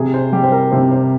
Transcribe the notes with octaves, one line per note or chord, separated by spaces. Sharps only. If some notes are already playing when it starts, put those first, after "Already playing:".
Already playing: C3 G#4
C5
G3 G4
C5
A#4
C3 C5
C5